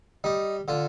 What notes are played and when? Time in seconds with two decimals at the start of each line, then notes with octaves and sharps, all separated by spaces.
0.24 G3 D#4
0.68 D3 F4